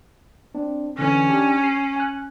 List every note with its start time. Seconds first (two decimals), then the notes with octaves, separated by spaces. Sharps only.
0.55 C4 D4
0.99 D3 E3 C#4
1.29 D4 G4 A5
1.64 C7
1.96 G#5 F#6